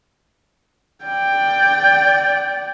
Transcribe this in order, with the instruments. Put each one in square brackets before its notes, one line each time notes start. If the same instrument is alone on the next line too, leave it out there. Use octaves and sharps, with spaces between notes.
[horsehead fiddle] D5 G5